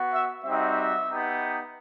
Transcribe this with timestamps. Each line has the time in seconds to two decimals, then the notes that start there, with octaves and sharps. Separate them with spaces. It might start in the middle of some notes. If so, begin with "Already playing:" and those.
Already playing: B3 F#4
0.14 E5
0.45 G3 C4 D#4 F#4 E5
1.09 B3 D#4 G4